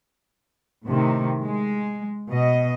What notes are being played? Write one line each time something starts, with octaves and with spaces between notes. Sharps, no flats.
A2 C3 D#3
G#3
B2 D#5